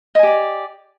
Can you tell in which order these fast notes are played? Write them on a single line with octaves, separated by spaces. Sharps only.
D#5 G#5 G4 D5